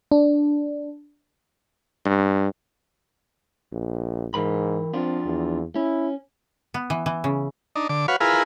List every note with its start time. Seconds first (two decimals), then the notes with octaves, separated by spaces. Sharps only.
0.12 D4
2.05 G2
3.72 A#1
4.34 G#2 E3 A#4 B5
4.94 F2 C4 D4 F4
5.25 E2
5.76 C#4 E4
6.74 B3
6.90 E3
7.06 E3
7.24 C#3
7.76 D4 D#4
7.89 D3 D6
8.08 F#4 B4 C#5 F5
8.20 E4 F4 G#4 A#4 B4